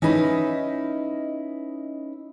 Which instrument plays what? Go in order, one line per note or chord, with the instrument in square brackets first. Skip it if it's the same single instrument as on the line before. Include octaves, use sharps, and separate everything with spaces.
[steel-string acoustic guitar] C#4 D#4 E4 B4 D#5